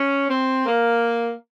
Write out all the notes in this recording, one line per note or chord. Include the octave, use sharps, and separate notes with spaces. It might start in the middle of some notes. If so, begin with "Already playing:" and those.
Already playing: C#4
C4
A#3